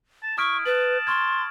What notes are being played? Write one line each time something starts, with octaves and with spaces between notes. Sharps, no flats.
A5
E4 C#6 D#6 F6 D7
B4 A5 F#7
C6 C#6 F6 G#6